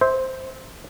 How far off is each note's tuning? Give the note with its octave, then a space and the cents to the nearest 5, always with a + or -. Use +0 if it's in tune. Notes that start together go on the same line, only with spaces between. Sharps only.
C5 +0 E5 -25